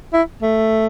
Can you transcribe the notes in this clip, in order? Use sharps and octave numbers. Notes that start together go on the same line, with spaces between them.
E4
A3